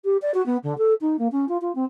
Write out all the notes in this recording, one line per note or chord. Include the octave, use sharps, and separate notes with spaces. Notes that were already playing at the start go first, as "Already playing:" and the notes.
G4
D5
F#4
B3
D3
A4
D#4
A#3
C#4
F4
F4
C4